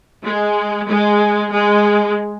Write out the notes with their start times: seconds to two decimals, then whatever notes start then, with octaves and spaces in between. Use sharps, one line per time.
0.24 G#3
0.88 G#3
1.52 G#3